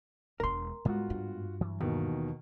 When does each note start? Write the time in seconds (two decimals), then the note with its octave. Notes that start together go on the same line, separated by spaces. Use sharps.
0.40 E1 D4 A#4 C6
0.85 G#2 G3 G#3 B3 F4 F#4
1.10 G2
1.61 E3 F#3
1.81 D#2 B2 D#3